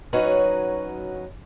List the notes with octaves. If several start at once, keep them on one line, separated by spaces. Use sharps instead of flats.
F#3 C#4 D#4 F#4 B4 C#5